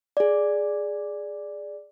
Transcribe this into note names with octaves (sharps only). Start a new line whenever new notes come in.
G#4 D5